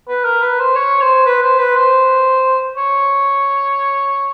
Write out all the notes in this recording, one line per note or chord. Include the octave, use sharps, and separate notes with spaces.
B4
A#4
B4
C5
C#5
C5
B4
C5
B4
C5
C#5